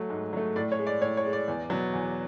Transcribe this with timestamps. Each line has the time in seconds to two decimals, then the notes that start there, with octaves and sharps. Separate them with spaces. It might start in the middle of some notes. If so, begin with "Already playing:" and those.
Already playing: F#3 A3
0.10 G#2
0.33 F#3 A3
0.56 A2 D5
0.72 C#5
0.79 G#3
0.87 D5
1.02 A2 C#5
1.17 C#5
1.25 G#3
1.33 D5
1.48 E2
1.70 B2 F#3
1.94 E2